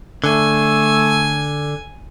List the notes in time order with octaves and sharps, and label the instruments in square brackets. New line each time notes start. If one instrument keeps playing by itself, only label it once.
[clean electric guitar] D3 [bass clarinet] A3 [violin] G#5